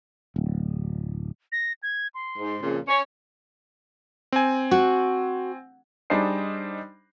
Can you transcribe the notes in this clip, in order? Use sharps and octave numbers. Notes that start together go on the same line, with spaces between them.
D1
A#6
G#6
C6
G#2
F2 A#2 C#3
C#4 C#5
C4 G#5
F#4
G3 D4 D#4 G#4 C5 C7